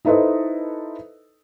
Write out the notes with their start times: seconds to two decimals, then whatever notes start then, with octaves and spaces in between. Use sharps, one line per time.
0.05 D#4 E4 A4 B4 C5 D#5